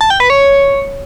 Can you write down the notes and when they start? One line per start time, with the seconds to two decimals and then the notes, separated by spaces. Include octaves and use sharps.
0.01 A5
0.10 G5
0.20 B4
0.30 C#5